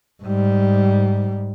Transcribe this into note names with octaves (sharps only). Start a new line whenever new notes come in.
G#2 G3